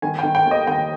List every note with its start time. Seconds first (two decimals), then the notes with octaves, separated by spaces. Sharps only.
0.02 D#3 G#5
0.19 D#3 G5
0.35 G5
0.45 D#2
0.51 D#5
0.67 D#2 G5